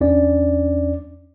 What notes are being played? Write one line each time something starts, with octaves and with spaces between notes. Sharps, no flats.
E2 C#4 D4 D5